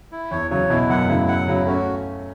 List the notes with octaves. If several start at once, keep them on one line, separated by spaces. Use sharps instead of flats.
E4
E2 C#5
C#3 F#3 C#5
B2 E3 E4
F#2 B2 F#5
A2 C#3 E4
F#5
C#3 F#3 E4
A3 C#4 F#4